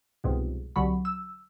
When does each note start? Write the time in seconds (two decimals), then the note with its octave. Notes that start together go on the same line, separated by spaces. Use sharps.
0.24 C2 F2 G#2 B2
0.76 C2 D3 F#3 B5
1.05 E6